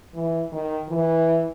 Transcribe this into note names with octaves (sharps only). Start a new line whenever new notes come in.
E3
D#3
E3